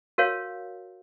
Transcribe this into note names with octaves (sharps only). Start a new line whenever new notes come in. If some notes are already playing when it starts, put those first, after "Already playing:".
F#4 A#4 C#5 F5